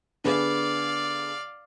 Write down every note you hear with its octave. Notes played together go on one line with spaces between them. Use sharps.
D3 B3 G#4 D5 F5